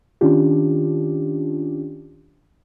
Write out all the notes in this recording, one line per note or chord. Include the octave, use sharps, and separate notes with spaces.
D#3 C#4 D4 F4 G4